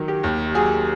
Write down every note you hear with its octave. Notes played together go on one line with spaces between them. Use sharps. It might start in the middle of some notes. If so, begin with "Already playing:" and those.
Already playing: D#3 F#3
G4
D#2
F#3 G#4